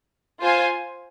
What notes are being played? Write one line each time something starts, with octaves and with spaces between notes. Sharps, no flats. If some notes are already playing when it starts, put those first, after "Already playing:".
F4 C5 F5 G#5